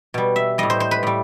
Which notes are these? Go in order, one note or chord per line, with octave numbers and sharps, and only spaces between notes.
B2 G3
E5
A2 G3 D#5
C5
C5
B4
A2 G3